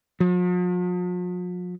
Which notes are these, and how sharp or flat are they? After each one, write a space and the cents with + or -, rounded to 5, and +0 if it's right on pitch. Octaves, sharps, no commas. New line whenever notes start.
F3 +45